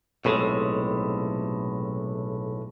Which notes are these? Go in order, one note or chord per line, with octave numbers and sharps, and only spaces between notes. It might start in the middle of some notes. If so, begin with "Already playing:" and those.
B1 A2 C3 G#3